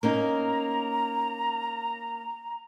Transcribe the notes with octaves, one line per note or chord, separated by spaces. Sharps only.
A#3 C#4 D#4 A#5